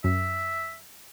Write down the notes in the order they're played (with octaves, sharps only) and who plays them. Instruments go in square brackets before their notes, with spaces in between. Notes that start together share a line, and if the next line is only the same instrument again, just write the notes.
[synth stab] F#2 [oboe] E5